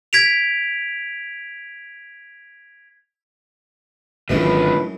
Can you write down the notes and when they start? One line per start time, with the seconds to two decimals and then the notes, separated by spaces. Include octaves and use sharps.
0.13 G#6 B6 D7 F7
4.29 G#1 F#2 A2 D3 E3 F3 G#3 B4